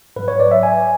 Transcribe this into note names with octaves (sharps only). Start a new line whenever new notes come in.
G#2 F#3 B4
C#5
D5
E5
G#5